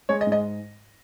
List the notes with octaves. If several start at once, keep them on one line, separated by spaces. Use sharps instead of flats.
G#3 C#5
D#5
G#2
D#5